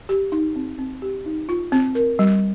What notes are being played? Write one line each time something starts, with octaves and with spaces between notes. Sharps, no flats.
G4
D#4
C4
C4
G4
D#4
F4
C4
A#4
G3